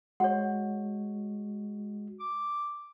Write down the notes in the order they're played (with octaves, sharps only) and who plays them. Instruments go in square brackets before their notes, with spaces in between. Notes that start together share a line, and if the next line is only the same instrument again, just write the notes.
[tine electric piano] G#3 F#4 [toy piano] C#5 F#5
[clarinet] D6